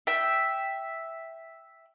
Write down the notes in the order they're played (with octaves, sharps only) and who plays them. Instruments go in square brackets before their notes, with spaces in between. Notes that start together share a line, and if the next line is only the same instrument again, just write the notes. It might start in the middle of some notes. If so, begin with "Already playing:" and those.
[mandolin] E5 G5